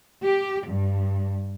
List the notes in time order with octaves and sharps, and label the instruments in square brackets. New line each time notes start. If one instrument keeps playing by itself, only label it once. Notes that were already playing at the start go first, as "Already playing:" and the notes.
[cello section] G4
G2